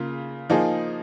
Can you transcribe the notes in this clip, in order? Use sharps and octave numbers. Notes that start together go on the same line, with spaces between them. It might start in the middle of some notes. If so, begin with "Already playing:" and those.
Already playing: C#3 A#3 F4
F3 A#3 D#4 G#4